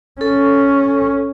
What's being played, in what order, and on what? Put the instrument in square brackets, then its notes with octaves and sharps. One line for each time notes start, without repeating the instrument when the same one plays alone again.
[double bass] C#4 [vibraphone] A4